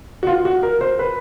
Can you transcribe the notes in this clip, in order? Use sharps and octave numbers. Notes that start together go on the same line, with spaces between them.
F#4
F4
F#4
A#4
C5
B4